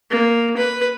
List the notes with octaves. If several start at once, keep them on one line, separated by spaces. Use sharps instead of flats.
A#3
B4